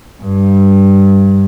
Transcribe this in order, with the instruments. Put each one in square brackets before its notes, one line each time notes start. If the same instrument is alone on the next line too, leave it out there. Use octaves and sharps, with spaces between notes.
[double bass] G2